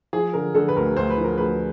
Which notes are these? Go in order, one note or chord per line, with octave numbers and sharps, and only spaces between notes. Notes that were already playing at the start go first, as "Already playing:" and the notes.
F3 G#4
D3 A#4
D3 A4
B4
D2 A#4
D2 C5
B4
F3
A#4
D2 B4